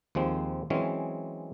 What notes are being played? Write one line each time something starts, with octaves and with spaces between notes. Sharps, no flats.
D#2 F3 G#3 C4
E3 F#3 G#3 C4 C#4